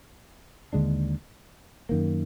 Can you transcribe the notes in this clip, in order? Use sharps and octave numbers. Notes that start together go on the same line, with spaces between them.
D#2 D3 G#3 D4
F#2 D#3 A#3